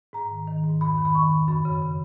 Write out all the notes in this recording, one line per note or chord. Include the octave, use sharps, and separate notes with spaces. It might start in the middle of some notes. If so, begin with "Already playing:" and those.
G#2 A#5
D#3
D#3
G#2
F2 B5
D#3
B5
D#3 C#6
F2
F#2 B5
C#3
C#3